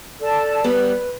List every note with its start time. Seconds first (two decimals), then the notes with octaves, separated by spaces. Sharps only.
0.20 A4 D5 A5
0.64 G3 B3 B4